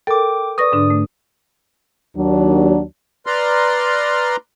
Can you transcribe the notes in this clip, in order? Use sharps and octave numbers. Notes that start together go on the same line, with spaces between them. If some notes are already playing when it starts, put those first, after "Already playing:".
A4 A#4 G5 D6
B4 D5 C#6 D#6 A#6
G#2 D3 D4
A3
D#2 F#3 D4
B4 D5 A#5 C6 F6